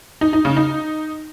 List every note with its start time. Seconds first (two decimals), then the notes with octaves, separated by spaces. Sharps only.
0.21 D#4
0.33 D#4
0.45 C#3
0.57 D#4